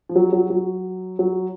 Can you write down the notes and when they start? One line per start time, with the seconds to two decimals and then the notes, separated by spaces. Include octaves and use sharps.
0.09 F3
0.16 F#3
0.33 F#3
0.50 F#3
1.19 F#3